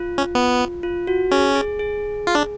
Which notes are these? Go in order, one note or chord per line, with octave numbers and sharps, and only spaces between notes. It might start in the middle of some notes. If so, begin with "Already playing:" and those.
Already playing: F4
C#4
B3
F4
F#4
C#4 G#4
G#4
G#4
F4
D4